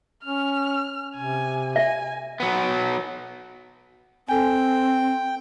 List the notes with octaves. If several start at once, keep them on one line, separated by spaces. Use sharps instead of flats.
C#4 F6
C3 G#5
E5 G#5
F#3 B3
C4 A4 G5 G#5